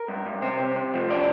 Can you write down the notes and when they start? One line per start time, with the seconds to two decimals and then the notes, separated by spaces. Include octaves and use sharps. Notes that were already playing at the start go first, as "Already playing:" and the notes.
Already playing: A#4
0.08 G2
0.26 G2
0.42 C3 C5
0.59 C3
0.76 C3
0.94 F3
1.10 C3 D5